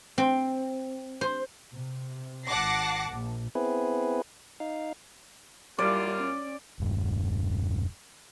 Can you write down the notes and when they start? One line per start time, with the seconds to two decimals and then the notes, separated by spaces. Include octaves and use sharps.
0.18 C4
1.21 C5
1.73 C3
2.47 G#1 F#5 A5 D6 A#6 C7
3.12 A#1
3.55 B3 C4 E4 G#4 B4
4.60 D#4 F5
5.79 F#2 G3 A#3 E4 F4 D5
6.16 C#4
6.80 E1 G2